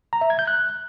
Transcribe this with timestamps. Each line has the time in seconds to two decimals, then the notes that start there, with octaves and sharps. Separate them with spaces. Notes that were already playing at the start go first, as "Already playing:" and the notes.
0.13 A#5
0.21 E5
0.30 G#6
0.39 G6
0.47 F#6